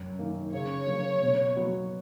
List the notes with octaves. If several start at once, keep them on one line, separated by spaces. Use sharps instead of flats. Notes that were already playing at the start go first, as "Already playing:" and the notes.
Already playing: F#2
D#3 A#3
C#3 C#5
F#3 A#3 C#4
B2
F#3 B3 F#4